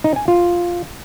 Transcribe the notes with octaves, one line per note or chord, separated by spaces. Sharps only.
D#4
G#5
F4